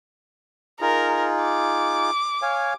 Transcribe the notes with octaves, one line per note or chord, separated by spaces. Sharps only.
D#4 F4 G#4 A#4
D6
C#5 F5 G#5